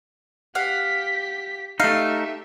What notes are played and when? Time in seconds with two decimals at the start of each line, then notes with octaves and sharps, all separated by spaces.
0.55 G4 F5 F#5 B6
1.80 A3 D#4 G4 E5 F5